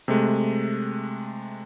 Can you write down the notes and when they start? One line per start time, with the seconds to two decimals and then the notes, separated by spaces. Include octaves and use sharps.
0.08 C3 G#3 A3